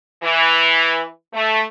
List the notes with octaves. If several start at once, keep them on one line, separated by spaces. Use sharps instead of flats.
E3
A3